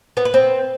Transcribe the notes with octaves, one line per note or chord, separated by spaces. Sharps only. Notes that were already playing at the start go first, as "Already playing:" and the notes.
B3
B4
C4